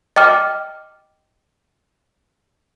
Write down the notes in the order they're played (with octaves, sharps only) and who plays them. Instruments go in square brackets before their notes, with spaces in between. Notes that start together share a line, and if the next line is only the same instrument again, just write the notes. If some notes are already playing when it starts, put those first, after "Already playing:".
[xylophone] D#5 G5 D6 F6